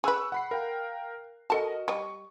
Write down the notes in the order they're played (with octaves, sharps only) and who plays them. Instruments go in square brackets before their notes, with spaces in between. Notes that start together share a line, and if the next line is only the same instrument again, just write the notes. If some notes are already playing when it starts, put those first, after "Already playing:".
[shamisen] G#4 B4 [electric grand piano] C#6 E6 F#6
[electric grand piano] F#5 B5 C7
A#4 F5 G5
[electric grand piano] F#4 A#4 D#5 [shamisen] A4 A5
[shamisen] G3 D#5 [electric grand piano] C#6